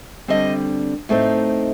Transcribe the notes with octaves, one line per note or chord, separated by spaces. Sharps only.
D3 G3 C4 D#5
A2 A3 C4 D#4